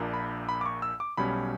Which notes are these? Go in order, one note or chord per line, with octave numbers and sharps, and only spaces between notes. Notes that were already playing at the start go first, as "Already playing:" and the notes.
Already playing: A#1 A#2 A#3 D4
B5
B5
D6
C#6
E6
D6
B1 B2 G3 C#4 B5